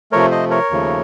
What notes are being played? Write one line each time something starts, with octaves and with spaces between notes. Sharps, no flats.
C3 F3 A3 A#4 C#5
C5 D#5
A#4 C#5
D#2 C#3 F3 A3